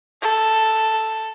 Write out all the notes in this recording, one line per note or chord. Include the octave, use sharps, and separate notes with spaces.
A4